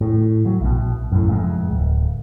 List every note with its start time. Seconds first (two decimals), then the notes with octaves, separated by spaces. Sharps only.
0.01 A2
0.46 F#3
0.61 A#1 B2
1.12 F#2 A2
1.28 F1 F2 G#3
1.71 D1